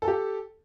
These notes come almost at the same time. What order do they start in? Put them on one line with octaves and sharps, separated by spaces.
A4 A5 G4